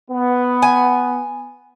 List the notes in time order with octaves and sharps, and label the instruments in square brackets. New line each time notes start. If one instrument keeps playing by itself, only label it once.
[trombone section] B3
[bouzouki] G#5